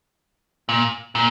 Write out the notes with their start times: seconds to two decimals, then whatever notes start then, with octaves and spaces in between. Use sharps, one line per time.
0.69 A#2
1.15 A#2